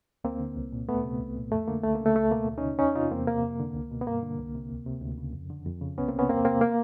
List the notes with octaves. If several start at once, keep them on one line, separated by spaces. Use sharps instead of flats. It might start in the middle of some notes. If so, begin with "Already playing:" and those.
D2 A#3 C4
D3
C2
A#2
D2 A3 B3
C3
C2
A#2
F2 A3
D3 A#3
C#2 A3
A#3
C#3
A3
C#2 A3
B2 A#3
D2
C#4 D#4
C#3
E2 C#4 D#4
C3 D#4 F4
E2 A#3 C4
C3 A#3
F2
D3
C#2
B2
B3
G2 A#3
D3
C2
C3
D2
C3
D2
C#3
F2
D3
F2
C#3
C2 B3 C#4
A#3 C4
C3
B3 C#4
E2 A#3 C4
C3 A#3 C4
A#3